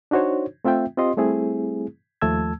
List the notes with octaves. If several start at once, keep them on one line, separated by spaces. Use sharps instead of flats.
D4 D#4 F#4 C5 C#5
A3 C4 F4 E5 G5
C4 F4 G4 D#5 C6
G3 A3 C4 E4 G#4
D#2 F3 A3 A5 E6 G#6